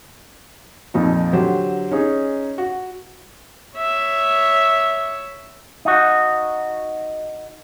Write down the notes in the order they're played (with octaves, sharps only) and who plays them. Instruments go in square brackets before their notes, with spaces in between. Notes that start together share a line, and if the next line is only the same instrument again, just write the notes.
[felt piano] F2 A#2 F3 D#4
D3 F#3 G4 C5
C#4 D#4 G#4
F#4
[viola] C#5 E5
[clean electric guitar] D#4 F#4